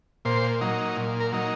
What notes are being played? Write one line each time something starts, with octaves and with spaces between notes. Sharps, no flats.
A#2 C5
F#3 A#3 D#4
A#2
A#4
F#3 A#3 D#4